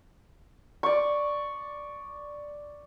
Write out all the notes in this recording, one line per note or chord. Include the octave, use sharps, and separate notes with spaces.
D5 C#6